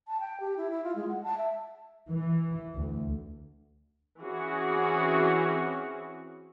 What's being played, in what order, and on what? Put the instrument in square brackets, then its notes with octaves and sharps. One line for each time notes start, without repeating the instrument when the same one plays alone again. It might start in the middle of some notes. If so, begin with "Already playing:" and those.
[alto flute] A5
G5
G4
E4
E4
F4
G#3
F#5
A5
E5
[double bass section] E3
D2
[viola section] E3 C4 C#4 F#4 G#4